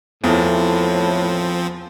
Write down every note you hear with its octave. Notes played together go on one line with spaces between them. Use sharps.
E2 A2 F3 C4